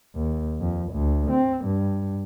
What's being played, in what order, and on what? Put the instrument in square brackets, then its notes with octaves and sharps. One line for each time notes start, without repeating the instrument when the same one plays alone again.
[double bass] D#2
F2
D2
C4
G2